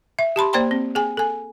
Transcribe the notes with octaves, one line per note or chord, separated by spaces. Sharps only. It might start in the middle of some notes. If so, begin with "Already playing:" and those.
E5
G4 A5 B5 C6
A#3 C5 D5 G5 A#5 C6
C4
G#4 G5 G#5
A4 G#5